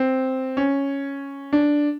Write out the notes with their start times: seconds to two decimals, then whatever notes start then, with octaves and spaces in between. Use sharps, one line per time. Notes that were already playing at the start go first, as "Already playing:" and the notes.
Already playing: C4
0.57 C#4
1.53 D4